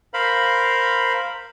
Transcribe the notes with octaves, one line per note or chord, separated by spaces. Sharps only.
A#4 C5 F5 B5